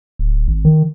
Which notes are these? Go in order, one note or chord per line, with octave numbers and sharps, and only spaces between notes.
D1
G#1
D#3